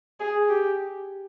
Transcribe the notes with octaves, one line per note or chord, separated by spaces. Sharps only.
G#4
G4